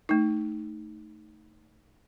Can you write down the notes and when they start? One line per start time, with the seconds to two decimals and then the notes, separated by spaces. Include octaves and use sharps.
0.09 A3 D#4